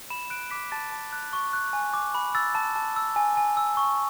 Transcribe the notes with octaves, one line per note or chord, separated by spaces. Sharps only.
B5 E7
F#6 D7
D6 B6
A5 A6
A5
F#6
C#6
F#6
G#5
D6
B5
E6 A6
A5
A5
E6
G#5
G#5
E6
C#6